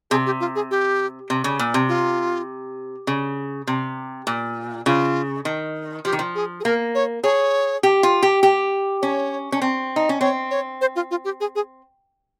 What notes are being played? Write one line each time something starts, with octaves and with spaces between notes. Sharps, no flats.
C3 G#4
G4
F4
G#4
G4
C3
C#3
A#2
C3
F4
C#3
C3
A#2
C#3 F4
D#3
F3 G4
D#3
F3
G#4
G#4
A#3 A#4
C#5
G#4 C#5
G4
F4
G4
G4
C#4 C#5
C#4
C4
D#4
C#4
C4 C#5
C#5
C5
F4
F4
G4
G#4
G#4